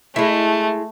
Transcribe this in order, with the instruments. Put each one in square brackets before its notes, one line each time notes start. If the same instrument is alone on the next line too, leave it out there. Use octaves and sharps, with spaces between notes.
[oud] G#3 E4 [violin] A3